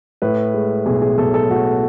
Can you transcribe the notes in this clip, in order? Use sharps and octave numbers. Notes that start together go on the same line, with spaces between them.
A2 B4
G#3
B1 G#4
G#4
B1 A4
A4
A2 F#4